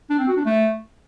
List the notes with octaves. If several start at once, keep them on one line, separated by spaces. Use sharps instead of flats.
D4
C4
F#4
D4
A3